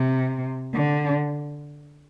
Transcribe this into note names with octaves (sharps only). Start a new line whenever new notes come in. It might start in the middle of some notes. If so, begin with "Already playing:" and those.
Already playing: C3
D3